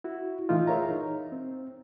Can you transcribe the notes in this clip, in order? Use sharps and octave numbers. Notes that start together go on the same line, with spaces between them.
E4 F#4
A#2 E3 A3 D#4 F4
G#4 A#4 C#5 E5 F5 A#5
D#4
C4